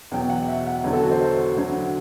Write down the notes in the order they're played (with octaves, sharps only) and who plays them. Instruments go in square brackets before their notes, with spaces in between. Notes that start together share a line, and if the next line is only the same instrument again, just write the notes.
[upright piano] E2 B2 F#3 G5
F#5
E5
F#5
E2 D3 F#3
A4
F#4
C5
C5
D2 D3 F#3